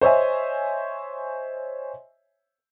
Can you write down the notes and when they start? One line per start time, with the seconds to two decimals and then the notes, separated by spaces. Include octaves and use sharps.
0.01 C5 C#5 D#5 E5 G#5